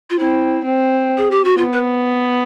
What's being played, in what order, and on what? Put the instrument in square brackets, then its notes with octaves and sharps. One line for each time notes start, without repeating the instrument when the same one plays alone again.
[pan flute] F4
[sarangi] C4 [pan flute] E4
[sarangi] C4
[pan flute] G#4
G4
F#4
[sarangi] B3 [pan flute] F4
[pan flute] B4